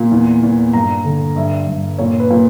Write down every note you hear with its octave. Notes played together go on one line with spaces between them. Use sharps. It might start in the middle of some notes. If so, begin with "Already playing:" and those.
Already playing: A#2
E2
E2
G2 A#5
D3
G2 E5
G2
A#2 C#5
B4
A#2